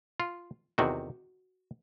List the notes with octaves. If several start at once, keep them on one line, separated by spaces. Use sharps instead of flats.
F4
E2 C3 D#3 F#4